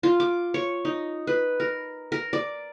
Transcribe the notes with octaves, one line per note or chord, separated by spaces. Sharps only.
F4
D6
C#5
D#4
B4
A#4
A#4
D5